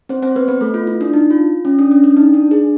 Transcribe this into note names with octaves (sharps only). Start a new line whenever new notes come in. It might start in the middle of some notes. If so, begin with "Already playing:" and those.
C4 C5
C4 C5
B3 B4
B3 B4
A3 A4
F4
E4
D4
D#4
F4
C#4
D4
C#4
D4
D#4
D4
G#4